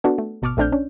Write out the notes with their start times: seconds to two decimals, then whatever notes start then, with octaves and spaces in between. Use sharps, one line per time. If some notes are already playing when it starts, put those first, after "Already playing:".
0.04 B3 D4 F#4 A4
0.18 A3
0.42 G#1 B2 A5 C#6 D6 F6
0.57 A#1 A3 C4 D4 F6 G6
0.72 C#4 D4